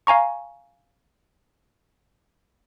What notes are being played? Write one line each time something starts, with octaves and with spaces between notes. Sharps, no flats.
F5 G#5 A#5 C#6